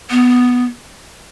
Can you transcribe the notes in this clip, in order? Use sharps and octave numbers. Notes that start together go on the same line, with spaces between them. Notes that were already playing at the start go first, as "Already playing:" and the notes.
B3